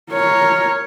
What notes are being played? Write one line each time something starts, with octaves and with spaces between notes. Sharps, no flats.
A#4 C#5